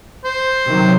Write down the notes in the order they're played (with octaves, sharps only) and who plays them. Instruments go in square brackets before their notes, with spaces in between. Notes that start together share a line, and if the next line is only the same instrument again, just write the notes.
[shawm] C5
[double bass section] C3 D#3 F#3